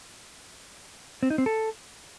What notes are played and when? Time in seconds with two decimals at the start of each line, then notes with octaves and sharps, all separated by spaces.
1.23 C4
1.30 D#4
1.38 C4
1.46 A4